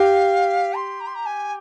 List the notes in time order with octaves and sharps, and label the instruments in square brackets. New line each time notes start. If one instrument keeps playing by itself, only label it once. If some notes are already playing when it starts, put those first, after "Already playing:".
Already playing: [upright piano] G4 [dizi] F5
[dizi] C6
A#5
C6
A#5
G#5